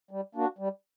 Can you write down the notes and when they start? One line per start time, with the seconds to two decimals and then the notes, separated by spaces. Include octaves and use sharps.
0.11 G3
0.35 A#3 D4 F#4
0.59 G3